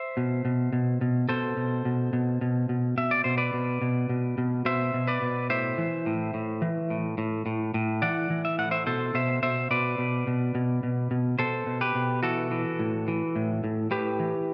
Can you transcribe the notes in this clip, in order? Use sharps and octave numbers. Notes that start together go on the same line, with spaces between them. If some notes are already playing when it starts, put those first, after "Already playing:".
Already playing: C5 E5
B2
B2
B2
B2
B2 A4 C5
B2
B2
B2
B2
B2
B2 E5
D5
B2 C5
B4 D5
B2
B2
B2
B2
B2 C5 E5
B2
B4 D5
B2
A2 C5 E5
E3
A2
A2
E3
A2
A2
A2
A2
E3 D5 F#5
E3
E5
A2 F#5
C5 E5
B2 A4 C5
B2 C5 E5
B2 C5 E5
B2 B4 D5
B2
B2
B2
B2
B2
B2 A4 C5
B2
G4 B4
B2
E3 F#4 A4
E3
A2
E3
A2
A2
A2 G4 B4
E3